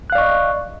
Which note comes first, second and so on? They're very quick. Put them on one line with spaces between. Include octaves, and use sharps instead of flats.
F#6 F5 D5 C#6 D#5